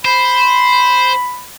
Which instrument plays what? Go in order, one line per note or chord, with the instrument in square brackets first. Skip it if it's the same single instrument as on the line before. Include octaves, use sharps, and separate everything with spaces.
[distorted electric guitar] C5 [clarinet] B5